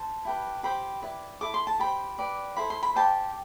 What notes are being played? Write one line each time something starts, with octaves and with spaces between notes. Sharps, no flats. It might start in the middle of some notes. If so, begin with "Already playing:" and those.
Already playing: C5 A5
E4 G4 B4
G4 C5 B5
E4 B4 D5
E4 A4 D6
C6
A5
G4 C5 B5
G4 B4 D5
E4 A4 C5 B5
C6
B5
G4 C5 A5